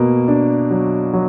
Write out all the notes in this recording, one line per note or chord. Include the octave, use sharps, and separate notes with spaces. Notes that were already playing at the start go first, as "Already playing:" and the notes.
Already playing: B2 A#3
D4
F#3
F#3